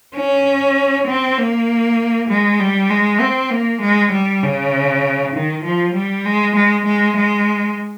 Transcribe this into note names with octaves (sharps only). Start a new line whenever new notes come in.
C#4
C4
A#3
G#3
G3
G#3
C4
A#3
G#3
G3
C#3
D#3
F3
G3
G#3
G#3
G#3
G#3